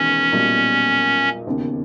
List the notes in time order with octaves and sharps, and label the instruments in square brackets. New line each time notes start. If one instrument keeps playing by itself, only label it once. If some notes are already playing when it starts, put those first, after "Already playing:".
Already playing: [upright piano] E1 E2 D#3 [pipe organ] C#4
[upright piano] B1 A#2 G3
E1 D#2 C#3